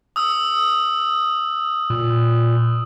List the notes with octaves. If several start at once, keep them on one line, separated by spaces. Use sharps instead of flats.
D#6 E6
A#2